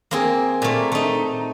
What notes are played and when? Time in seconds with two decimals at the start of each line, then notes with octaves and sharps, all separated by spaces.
0.11 A#3 C4 G#4
0.62 A#2 A3
0.92 A3 D#4